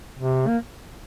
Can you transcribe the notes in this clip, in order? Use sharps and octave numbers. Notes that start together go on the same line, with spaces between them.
C3
A#3